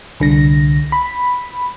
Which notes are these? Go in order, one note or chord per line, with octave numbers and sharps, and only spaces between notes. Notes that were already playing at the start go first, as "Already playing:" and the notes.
C2 D3 A#6
B5